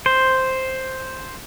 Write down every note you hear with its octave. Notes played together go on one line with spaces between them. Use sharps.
C5